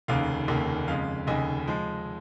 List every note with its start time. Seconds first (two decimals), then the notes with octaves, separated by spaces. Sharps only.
0.08 F1 D#2 C#3 F5
0.48 F1 D#2 C#3 A#3
0.88 F2 C#3 G#3 F5
1.27 F1 D#2 C#3 D#5 G#5
1.67 F3 G#3